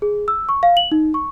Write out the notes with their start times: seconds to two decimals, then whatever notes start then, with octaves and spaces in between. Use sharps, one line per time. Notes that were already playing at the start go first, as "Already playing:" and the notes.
0.02 G#4
0.28 E6
0.49 C#6
0.63 F5
0.77 F#7
0.92 D#4
1.14 C#6